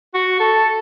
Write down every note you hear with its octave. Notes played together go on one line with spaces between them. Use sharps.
F#4
A4